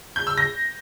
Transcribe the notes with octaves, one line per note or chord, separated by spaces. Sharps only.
G6
E6
A#6